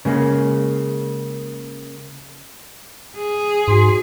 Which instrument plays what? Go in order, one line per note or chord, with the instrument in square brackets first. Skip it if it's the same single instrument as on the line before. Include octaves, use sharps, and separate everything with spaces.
[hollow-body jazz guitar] C#3 G#3 A#3
[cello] G#4
[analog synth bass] G#2 [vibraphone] F#4 C6